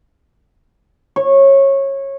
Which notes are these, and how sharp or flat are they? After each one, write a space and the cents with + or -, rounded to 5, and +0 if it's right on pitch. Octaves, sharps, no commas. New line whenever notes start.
C#5 -20